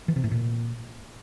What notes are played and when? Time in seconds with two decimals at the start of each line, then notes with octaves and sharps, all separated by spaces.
0.08 E3
0.16 C3
0.24 A2
0.31 A#2